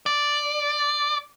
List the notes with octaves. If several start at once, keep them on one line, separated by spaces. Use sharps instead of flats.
D5